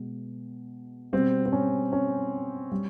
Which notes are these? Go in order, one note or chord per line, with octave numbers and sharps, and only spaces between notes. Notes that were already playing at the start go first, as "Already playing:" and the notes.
Already playing: B2 G#3
B2 G3 C4
C4
C#4
C#4
G3